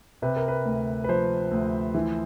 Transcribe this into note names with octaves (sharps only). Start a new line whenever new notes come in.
C3 B4
A#4
B4
D2
B4
F3 C5
D2
E3